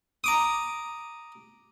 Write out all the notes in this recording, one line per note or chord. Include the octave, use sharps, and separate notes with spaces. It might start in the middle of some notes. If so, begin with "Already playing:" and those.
A#5 D6 D#6